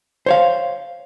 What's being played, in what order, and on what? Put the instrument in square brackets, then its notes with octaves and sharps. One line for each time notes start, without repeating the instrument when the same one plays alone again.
[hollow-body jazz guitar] C5 C#5 F5